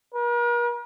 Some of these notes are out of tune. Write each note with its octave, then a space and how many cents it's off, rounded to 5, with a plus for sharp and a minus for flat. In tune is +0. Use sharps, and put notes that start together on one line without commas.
A#4 +45